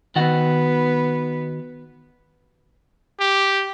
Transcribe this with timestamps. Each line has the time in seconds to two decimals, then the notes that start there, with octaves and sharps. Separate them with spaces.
0.16 D#3 B3 F#4 F#5
3.20 G4